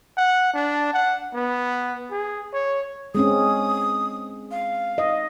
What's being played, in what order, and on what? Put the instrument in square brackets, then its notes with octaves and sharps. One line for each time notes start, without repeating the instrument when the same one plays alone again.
[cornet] F#5
D4
F#5
B3
G#4
C#5
[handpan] G#3 C4 C#4 [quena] D#6
[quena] F5
[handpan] D#5